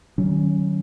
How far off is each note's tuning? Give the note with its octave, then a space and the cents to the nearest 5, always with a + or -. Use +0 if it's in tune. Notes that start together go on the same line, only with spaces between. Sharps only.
D#3 -20 F#3 +25 C#4 +0